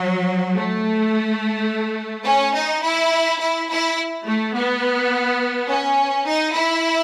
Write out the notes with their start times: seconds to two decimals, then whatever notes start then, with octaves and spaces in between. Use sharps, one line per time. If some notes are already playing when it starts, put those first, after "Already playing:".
Already playing: F#3
0.54 A3
2.25 C#4
2.54 D#4
2.83 E4
3.40 E4
3.69 E4
4.25 A3
4.54 B3
5.68 C#4
6.25 D#4
6.54 E4